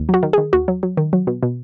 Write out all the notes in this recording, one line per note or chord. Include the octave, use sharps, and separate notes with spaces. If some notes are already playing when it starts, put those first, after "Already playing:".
Already playing: D#2
F#3 F#4
D#3
D#3 G#4
D#2 F#4
F#3
F#3
D#3
F#3
B2
B2